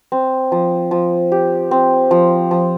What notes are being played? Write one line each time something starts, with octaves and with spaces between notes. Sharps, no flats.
C4
F3
F3
G4
C4
F3
F3